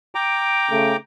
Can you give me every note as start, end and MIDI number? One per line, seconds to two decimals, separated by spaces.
0.15 0.96 79
0.15 0.96 82
0.15 0.96 86
0.70 0.94 49
0.70 0.94 57